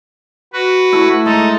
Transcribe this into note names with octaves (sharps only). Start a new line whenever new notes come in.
F#4 B4
A3 E4
G#3 D#4 A4